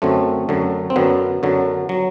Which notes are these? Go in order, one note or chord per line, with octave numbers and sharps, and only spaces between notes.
F#2 D3 F#3 A3 C4
F#2 D3 F#3
C4
F#2 D3 F#3 B3
F#2 D3 F#3
F#3